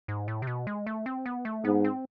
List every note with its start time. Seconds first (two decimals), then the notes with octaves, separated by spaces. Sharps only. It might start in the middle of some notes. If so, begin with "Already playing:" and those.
0.08 G#2
0.28 A2
0.42 C3
0.47 B2
0.67 G#3
0.87 A3
1.06 C4
1.26 B3
1.45 A3
1.64 G#2 B3
1.85 C4